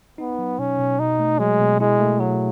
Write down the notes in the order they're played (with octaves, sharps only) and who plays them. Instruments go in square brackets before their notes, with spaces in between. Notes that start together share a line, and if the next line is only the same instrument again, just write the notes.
[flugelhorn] B3 [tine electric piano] D#4
[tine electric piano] F#3
[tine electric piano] B2 [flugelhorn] C#4
[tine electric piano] B2
[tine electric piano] B2 [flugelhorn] D#4
[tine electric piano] A3
[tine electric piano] F#3 [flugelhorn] G#3
[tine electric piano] B2
[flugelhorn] G#3 [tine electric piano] E4
[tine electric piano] A3
[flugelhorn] F#3 [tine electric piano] G#4